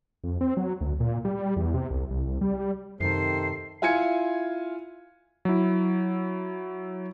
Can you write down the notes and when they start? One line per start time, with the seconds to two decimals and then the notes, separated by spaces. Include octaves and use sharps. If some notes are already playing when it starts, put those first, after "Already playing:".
0.24 F2
0.41 C4
0.57 F#3
0.81 D2
1.00 A#2
1.25 G3
1.57 E2
1.74 C3
1.91 C2
2.11 C2
2.41 G3
3.00 F#2 C3 D#3 A4 C5 C7
3.82 E4 F4 G#5 G#6 C#7
5.45 F#3 E4